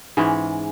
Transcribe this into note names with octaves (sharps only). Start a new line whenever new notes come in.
G#2 E3 G#3 C#4